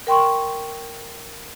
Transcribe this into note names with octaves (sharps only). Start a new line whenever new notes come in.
A#4 G5 C6 C#6